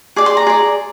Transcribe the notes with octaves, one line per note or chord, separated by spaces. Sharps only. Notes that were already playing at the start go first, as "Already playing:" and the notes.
G#4 D5 D6
C6
A#5
G#4 D5